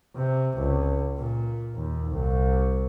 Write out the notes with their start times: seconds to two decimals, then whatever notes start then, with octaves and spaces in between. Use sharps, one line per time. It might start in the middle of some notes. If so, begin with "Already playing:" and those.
0.17 C3
0.58 C#2
1.19 A#2
1.75 D#2
2.11 C2